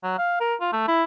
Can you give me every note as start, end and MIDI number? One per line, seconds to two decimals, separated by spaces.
0.03 0.14 54
0.18 0.37 77
0.40 0.55 70
0.60 0.72 65
0.73 0.83 57
0.88 1.04 64